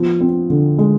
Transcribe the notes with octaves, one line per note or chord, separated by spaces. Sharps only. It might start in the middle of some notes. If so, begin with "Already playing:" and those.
Already playing: F3 B3
C4
D3
G#3